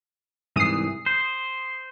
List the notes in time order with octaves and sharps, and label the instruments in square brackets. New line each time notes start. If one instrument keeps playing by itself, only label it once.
[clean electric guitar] C2 G#2 E3 [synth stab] D#6 C7
[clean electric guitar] C5